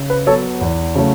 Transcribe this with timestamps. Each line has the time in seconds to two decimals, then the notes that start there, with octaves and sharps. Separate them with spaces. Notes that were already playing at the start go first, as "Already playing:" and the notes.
Already playing: C#3
0.10 B4
0.27 F#3 A4 C#5
0.30 B3
0.61 E2
0.95 C#3 F#3 A3 C#4